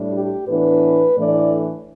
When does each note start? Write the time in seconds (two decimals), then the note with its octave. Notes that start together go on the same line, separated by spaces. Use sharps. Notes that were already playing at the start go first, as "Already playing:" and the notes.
Already playing: A2 G3 D4
0.13 G4
0.47 A2 E3 B3 D4 B4
1.17 A2 E3 A3 D4 D5